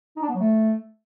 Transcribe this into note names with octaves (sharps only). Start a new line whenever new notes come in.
D#4
D4
B3
F#3
A3